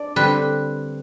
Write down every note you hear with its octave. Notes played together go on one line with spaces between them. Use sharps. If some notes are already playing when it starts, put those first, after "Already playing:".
Already playing: D4 D5
D3 G3 C4 B4